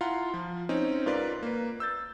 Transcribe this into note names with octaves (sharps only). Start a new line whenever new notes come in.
E4 F4 F5 F#5 A#5 C6
F3
C4 C#4 D#4
G#2 F4 A#4 B4 D5
A#3 B4
E6 G6 A6